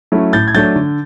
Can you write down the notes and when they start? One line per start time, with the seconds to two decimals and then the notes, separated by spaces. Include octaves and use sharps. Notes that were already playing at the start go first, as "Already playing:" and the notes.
0.12 F#3 A3 C#4 E4
0.33 A2 G6 A6
0.48 G#6
0.54 F#3 A3 D4 G6 A6
0.76 D3